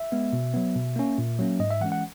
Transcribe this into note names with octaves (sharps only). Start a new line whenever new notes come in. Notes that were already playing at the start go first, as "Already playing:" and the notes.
Already playing: E5
G#3 B3
B2
F#3 B3
B2
A#3 C#4
A#2
F#3 A#3 C#4
G#2 D#5
E5
E3 G#3 C#4 F#5
F#5